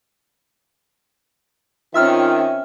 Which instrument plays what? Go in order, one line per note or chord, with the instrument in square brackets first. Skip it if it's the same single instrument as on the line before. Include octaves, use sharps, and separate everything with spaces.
[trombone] D#3 [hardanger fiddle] C4 C#4 [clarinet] F4 [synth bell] E5 E6 F6